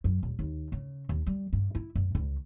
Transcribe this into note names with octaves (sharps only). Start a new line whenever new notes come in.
F#2
D#1
D#2
C#3
D#2
G3
G2
E4
F#2
C#2